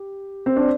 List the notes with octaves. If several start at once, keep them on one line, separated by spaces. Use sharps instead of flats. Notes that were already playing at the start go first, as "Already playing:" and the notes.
Already playing: G4
C4
D4